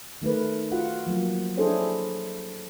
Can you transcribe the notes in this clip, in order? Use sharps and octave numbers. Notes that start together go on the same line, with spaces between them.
D#3 A3 A#4 B4
F4 F#4 F#5
F3 F#3 A#3 F4
D4 E4 G#4 A4 C5 C#5